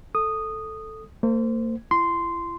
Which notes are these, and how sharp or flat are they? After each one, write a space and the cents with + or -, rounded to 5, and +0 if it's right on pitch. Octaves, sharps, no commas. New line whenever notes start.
A4 +0 D#6 -10
A#3 -45 C5 -15
E4 +40 C6 -10